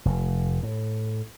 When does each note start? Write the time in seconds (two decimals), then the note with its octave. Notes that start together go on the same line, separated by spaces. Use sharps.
0.05 F1
0.63 A2